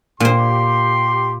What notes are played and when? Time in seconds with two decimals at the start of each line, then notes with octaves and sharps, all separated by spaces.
0.20 A#2 G4 C5 C6